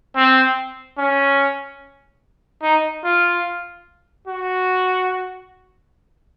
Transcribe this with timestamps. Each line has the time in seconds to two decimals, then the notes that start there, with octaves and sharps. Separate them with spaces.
0.16 C4
0.98 C#4
2.62 D#4
3.04 F4
4.27 F#4